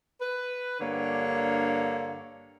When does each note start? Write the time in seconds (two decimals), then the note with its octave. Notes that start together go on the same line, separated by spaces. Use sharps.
0.20 B4
0.80 G2 D3 A#3 C#5